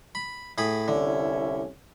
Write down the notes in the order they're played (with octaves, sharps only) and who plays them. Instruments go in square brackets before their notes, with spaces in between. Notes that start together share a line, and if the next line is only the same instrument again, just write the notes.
[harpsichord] B5
A2 G#4 B5
[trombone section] C2 C#4 E4 [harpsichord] D3